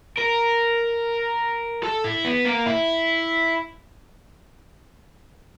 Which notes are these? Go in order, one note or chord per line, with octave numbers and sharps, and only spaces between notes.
A#4
A4
E4
B3
A#3
E4